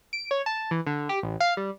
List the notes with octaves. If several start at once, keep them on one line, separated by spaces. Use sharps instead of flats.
D7
C#5
A5
E3
D3
G4
A1
F5
G3